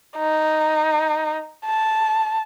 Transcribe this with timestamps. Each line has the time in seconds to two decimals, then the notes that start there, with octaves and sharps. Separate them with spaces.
0.17 D#4
1.65 A5